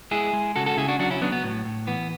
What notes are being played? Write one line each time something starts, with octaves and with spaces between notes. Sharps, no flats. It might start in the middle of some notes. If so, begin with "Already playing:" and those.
G#3 E4 G#4
G#3
C#3 F#4 A4
F#4 A4
C#3 E4 G#4
D4 F#4
F#3 D4 F#4
C#4 E4
F#3 B3 D4
B3
A2
A2
E3 B3